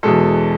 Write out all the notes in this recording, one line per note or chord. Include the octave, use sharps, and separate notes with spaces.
E2 B2 G#3 A4